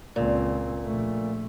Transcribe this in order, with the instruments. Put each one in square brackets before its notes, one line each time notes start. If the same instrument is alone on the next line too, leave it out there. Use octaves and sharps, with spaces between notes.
[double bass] C#2 C4 [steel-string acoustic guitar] A#2
[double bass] A#1 A3